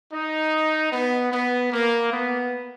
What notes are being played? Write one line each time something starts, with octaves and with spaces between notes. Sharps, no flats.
D#4
B3
B3
A#3
B3